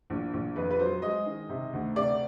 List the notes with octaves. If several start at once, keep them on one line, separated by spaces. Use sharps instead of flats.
A#1
A#1
F2 B4
B4
F#3 C5
G#3 D#5
D#3
C3
D2
C3 D5